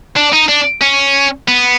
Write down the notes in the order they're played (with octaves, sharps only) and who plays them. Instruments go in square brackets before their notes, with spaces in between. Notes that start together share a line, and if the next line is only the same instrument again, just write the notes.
[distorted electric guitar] D4
D#4
D4
C#4
B3